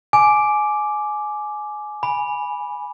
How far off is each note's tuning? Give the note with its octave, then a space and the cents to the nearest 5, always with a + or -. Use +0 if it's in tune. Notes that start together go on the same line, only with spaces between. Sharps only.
G#5 +20 D6 +0
G#5 +0 B5 -10